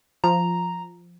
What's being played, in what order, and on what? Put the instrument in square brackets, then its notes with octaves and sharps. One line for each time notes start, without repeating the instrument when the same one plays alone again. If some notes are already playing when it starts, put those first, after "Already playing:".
[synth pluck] F3 [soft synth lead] A#5